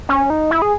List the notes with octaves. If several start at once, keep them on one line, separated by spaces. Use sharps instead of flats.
C#4
D#4
E4
G#4